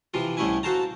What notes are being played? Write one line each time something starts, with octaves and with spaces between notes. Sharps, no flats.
C3 E3 F3 F4
C2 A2 A3 C#4 E4 G#5
F#4 A4 C5 F5 A5 A#5